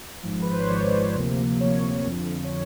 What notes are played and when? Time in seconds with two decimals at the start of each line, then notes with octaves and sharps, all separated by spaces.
0.23 G#1 G#2 F3
0.42 B4
0.51 C5
0.60 C#5
0.69 G#1 G#2 F3 D5
1.15 D2 C3 F3 A#3
1.60 D2 C3 F3 A#3 C#5
2.06 F2 D3 F3
2.44 C#5